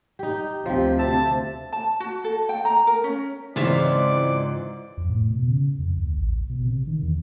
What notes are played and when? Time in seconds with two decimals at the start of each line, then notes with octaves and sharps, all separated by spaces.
0.19 D#4 G4
0.66 D2 C3 F3 C4 G4
0.99 E5 A5
1.72 A5
2.00 F#4
2.24 A4
2.49 G5
2.65 A#5
2.87 A#4
3.04 C#4
3.56 G#2 C#3 E3 C4 F4 D5 E5
4.97 F2
5.10 A2
5.30 B2
5.48 C#3
5.79 F2
5.97 D2
6.17 A1
6.49 B2
6.62 C3
6.87 D#3
7.03 E2